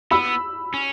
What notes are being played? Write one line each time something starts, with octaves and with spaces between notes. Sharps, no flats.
B3 B5 E6
C#4